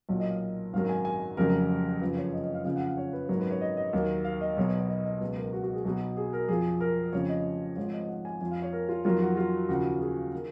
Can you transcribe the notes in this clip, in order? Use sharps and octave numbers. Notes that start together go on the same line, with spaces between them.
B1 A#2 F#3 C#5
D#5
F5
G#1 F#2 D#3 F#3 F5
G#5
G#5
F1 F2 C#3 F#3 A#4
F#1 F2 C#3 F3 B4
C#5
D#5
D#5
F5
F2 C#3 F3 F5
F#5
F5
C#5
B4
G#1 F#2 D#3 F#3 C#5
B4
C#5
D#5
D#5
D#2 D#3 F#3
F5
D#5
B1 B2 F#3 C#5
B4
C#5
D#5
D#5
C#2 B2 F#3 B4
A#4
F#4
F#4
G#4
B1 B2 F#3 F#4
G#4
A#4
F2 F3 G#4
A#4
F1 F2 C#3 F3 C#5
D#5
G#1 G#2 F3 C#5
D#5
F#5
G#5
F2 F3 G#5
F5
C#5
A#4
F4
F2 D#3 F#3 F4
F#4
F4
D#2 C#3 F3 F#4
G#4
D#3